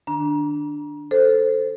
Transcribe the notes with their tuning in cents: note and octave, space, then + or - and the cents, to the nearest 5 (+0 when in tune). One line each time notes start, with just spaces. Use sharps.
D#3 -30 D4 +0 A#5 +30
A4 +10 C5 +0